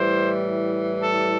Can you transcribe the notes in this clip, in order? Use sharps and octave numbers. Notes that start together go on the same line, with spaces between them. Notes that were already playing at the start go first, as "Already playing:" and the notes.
Already playing: A2 E3 G3 C5
A4